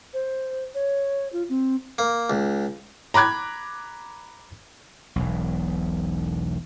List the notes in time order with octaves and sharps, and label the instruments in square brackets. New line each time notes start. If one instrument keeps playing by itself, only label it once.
[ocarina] C5
C#5
F4
C4
[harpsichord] A#3
C#2
[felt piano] A#5 B5 D6 F#6 G#6
[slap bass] E1 B1